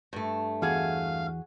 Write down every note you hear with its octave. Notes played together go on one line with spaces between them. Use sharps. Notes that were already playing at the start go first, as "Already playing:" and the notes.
G2 A3
E2 F#4 G#4 F5